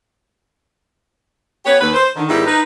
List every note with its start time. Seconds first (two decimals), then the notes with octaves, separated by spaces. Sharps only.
1.65 B3 G4 B4 C#5
1.80 D#2 B4
1.93 C5
2.16 D3 D#3
2.28 G#2 D#3 G3 G#3 B3 E4
2.46 D#4 B4